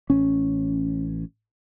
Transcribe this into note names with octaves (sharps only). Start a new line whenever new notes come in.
A1 C#4